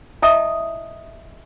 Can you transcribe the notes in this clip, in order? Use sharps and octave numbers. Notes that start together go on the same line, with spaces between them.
E4 D#5 E5 G5 A5 D#6